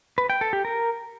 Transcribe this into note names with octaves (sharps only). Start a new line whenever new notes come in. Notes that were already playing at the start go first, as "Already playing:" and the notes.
B4
G5
A4
G4
A#4